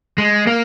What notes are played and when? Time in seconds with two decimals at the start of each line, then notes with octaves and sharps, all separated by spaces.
0.18 G#3
0.47 A#3